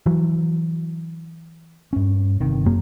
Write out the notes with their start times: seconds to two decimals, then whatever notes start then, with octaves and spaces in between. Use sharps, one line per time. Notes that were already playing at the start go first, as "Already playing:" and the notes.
0.06 E3 F#3
1.93 G2 C#4
2.40 G1 C3 D#3
2.66 F#2 A#3